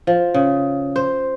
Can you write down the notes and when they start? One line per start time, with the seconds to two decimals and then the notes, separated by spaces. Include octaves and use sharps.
0.07 F3
0.34 C#3
0.96 C5